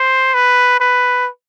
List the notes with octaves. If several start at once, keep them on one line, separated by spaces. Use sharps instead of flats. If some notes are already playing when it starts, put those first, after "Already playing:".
Already playing: C5
B4
B4